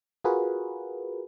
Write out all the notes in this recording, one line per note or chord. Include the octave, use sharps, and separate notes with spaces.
F4 F#4 G#4 A#4 B4